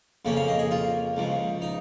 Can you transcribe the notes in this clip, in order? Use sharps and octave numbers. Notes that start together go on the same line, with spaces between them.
F2 C#3 F3 A#3 C#4
F5
D#5
G#4
F4
C#2 C#3 F3
D#4